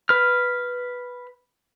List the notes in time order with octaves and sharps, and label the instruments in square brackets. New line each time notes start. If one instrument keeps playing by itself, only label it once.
[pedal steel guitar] B4 F6